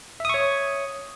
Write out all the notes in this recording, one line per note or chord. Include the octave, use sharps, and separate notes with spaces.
C#5 E5 C#6 D#6